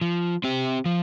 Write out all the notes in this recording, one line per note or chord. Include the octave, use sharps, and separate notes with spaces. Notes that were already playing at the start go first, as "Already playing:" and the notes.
F3
C4 G4
F3